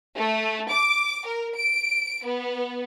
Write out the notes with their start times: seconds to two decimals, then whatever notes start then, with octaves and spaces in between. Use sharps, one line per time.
0.17 A3
0.73 D6
1.27 A#4
1.57 D7
2.25 B3